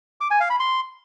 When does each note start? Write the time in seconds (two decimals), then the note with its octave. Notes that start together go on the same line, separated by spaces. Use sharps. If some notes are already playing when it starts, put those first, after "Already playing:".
0.21 D6
0.30 G#5
0.40 F5
0.50 B5
0.60 C6